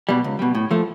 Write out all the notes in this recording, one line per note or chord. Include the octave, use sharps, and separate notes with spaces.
B2 G3
C#2
B2 G3
A2
F3 A3